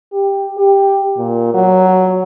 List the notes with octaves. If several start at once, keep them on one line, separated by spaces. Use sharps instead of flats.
G4
G4
A#2
F#3